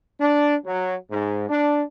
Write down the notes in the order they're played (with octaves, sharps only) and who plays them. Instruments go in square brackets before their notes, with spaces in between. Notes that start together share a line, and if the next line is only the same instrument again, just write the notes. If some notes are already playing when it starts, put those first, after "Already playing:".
[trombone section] D4
F#3
G#2
D4